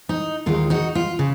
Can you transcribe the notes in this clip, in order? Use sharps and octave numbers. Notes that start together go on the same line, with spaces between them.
D#4
D#2 D#3 G#3 F4
D#4 F#4
F4
C#3